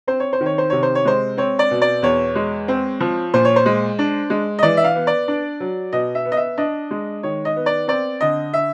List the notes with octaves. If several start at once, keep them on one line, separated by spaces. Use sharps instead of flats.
C4 C5
C#5
C5
D#3
C#5
C5
C3 C#5
C5
C#5
G#3 C5
C4 C#5
D5
B2
D5
E2 C#5
G#3
C4
F3
A#2 C5
C#5
C5
G#3
D4
G#3
D#5
E3 D5
E5
F5
B3
D5
D4
F#3
B2 D#5
E5
B3
D#5
E5
D4 D#5
G#3
D#3 C#5
D#5
B3
D5
C4 D5
D3 D#5
E5